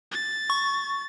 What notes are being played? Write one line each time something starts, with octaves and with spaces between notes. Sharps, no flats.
A6
C#6